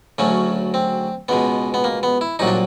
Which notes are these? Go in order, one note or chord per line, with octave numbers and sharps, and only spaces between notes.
D2 C#3 F#3 A3 C#4
C4
C#2 B2 G#3 B3
B3
A#3
B3
E4
C2 A#2 F#3 D#4
D4